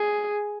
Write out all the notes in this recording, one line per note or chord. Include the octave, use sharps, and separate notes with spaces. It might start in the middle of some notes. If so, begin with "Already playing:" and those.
Already playing: G#4